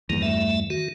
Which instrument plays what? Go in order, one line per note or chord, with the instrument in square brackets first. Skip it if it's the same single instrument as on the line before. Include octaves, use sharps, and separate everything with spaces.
[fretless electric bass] E2 G2 [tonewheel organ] D#3 A#3
[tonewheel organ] A3 E5
D#3 F#4